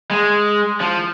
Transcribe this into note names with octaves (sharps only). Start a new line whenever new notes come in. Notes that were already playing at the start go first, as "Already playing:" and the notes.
G#3
F3